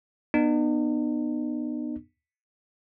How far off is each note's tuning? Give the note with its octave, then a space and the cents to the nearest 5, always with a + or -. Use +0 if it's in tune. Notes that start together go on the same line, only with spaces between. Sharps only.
B3 -15 D#4 -45